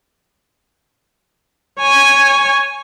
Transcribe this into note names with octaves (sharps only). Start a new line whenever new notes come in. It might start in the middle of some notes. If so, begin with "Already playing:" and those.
C#5 G#5